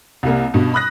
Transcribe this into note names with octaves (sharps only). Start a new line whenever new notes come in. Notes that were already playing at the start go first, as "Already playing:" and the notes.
C2 G3 A#3
G2 B2
B5 D#6 F#6 A#6